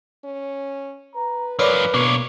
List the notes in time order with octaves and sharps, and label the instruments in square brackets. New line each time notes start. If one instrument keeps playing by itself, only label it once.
[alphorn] C#4
[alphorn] B4 [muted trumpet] A#5
[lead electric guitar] F#2 F4 [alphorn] A#4 [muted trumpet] B4 [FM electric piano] C#5 D5 D6
[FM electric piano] B2 [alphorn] A#3 [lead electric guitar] D4 C#5